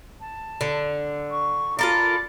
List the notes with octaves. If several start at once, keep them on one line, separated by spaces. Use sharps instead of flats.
A5
D3
C#6
F4 A4 A#4 D5 B5